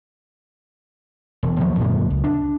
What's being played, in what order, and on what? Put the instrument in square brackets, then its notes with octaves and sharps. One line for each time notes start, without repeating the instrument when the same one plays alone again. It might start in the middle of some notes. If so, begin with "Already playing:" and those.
[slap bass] E1
D#2 F3 F#3
F#2 A#2 D3
C#2
D4